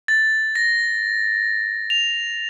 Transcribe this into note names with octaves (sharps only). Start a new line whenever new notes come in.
A6
A#6
F7